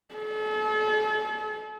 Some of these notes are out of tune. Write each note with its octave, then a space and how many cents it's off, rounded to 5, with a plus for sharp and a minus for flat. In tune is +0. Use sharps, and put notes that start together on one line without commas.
A4 -40